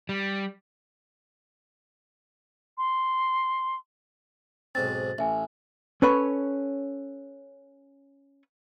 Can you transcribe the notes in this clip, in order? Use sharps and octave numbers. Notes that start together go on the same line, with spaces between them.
G3
C6
B1 G#2 C4 A6
A1 E5 G#5
C#4 A4 B4 C#5